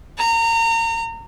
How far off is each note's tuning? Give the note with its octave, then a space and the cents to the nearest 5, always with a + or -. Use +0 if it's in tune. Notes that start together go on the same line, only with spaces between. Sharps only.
A#5 -30